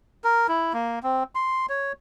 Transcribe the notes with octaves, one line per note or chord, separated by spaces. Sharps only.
A#4
E4
A#3
C4
C6
C#5